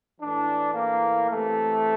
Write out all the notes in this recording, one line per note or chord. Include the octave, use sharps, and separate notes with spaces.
A2 E3 D4
A#3
C3 E3 A3